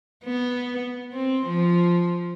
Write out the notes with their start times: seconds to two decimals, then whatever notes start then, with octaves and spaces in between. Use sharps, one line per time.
0.24 B3
1.13 C4
1.46 F3